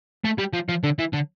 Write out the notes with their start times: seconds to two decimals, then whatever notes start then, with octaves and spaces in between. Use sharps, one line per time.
0.24 A3
0.38 G3
0.53 F3
0.69 F3
0.84 D3
0.99 E3
1.14 D3